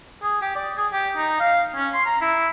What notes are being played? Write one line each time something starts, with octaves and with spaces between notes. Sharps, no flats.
G#4
G4
D5
G#4
G4
D#4
F5
C#4
C6
A#5
E4